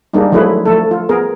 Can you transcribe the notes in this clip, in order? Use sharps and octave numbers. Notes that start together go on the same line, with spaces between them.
G3 G#3 A#3 D4 D#4
F3 F#3 A3 E4 G#4 B4
F3 A3 A4
F4
B3 G#4 A#4